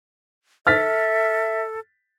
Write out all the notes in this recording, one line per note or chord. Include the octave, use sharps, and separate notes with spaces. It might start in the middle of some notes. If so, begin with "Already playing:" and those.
A4 E5 F6 A6 B6